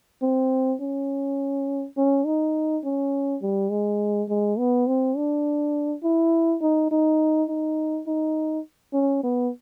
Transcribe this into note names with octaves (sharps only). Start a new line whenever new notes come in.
C4
C#4
C#4
D#4
C#4
G3
G#3
G#3
B3
C4
D4
E4
D#4
D#4
D#4
D#4
C#4
B3